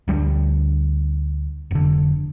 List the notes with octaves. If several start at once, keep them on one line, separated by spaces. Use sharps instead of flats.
D2 G3 C4 D4
F1 D3